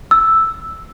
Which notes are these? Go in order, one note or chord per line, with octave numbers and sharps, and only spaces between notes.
E6